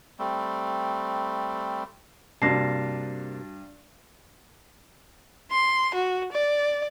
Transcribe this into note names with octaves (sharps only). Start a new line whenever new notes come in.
G3 A3 C4
G2 C3 A#3 D4 F#4 A5 A#6 C7
C6
F#4
D5